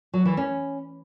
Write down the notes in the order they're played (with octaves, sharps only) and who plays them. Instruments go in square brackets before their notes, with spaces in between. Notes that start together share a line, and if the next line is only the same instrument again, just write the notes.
[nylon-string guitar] F#3
E3
C#4